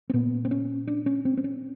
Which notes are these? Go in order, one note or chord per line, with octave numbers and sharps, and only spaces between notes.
C4
A#2 B3
C4
C#4
D4
C#4
C4
C4
C#4